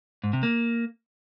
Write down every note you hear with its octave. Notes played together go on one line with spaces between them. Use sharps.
G#2
C3
A#3